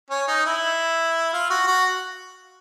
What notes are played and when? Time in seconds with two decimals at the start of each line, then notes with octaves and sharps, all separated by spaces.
0.10 C#4
0.28 D#4
0.46 E4
1.33 F4
1.50 F#4
1.68 F#4